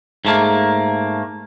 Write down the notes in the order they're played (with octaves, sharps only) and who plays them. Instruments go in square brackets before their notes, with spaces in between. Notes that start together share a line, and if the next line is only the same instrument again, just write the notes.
[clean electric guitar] G#2 A3 A#3